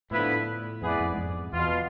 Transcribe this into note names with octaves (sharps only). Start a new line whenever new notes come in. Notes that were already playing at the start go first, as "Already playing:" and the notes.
A2 D3 F3 B3 E4 B4
F2 B3 E4 G#4 B4 D5
F2
G#2
F2
E2 B2 B3 F4